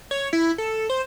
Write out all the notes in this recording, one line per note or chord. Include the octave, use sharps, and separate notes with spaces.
C#5
E4
A4
C5